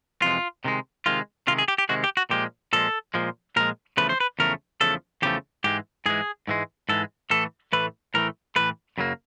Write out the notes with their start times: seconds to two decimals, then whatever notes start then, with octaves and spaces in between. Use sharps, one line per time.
0.22 F2 C3 E3 G#3 F4
0.64 C3 D#3 G#3
1.06 C3 D#3 G#3 F4
1.48 C3 D#3 G#3 F4
1.58 G#4
1.68 G4
1.78 G4
1.89 C3 D#3 G#3 F#4
2.04 G4
2.17 F#4
2.30 A#2 F3 G#3 G4
2.73 A#2 F3 G#3 A4
3.14 A#2 F3 G#3
3.56 A#2 F3 G#3 A#4
3.97 E2 C#3 F3 A3 B4
4.09 C5
4.20 B4
4.39 E2 C#3 F3 A3 A#4
4.81 E2 C#3 F3 A3 A4
5.22 E2 C#3 F3 A3 G4
5.64 G#2 E3 G#3 G4
6.06 G#2 E3 G#3 G#4
6.48 G#2 E3 G#3
6.89 G#2 E3 G#3 A4
7.30 A2 E3 A3 A4
7.73 A2 E3 A3 B4
8.14 A2 E3 A3 A#4
8.56 A2 E3 A3 B4
8.98 F#2 C#3 F#3 A#3